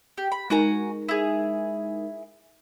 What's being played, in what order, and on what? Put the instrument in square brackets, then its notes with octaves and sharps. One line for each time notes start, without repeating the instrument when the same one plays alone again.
[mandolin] G4
B5
[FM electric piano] G#3 D#4 A#4 [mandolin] F#4 G#5 A#5
[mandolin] E4 G#4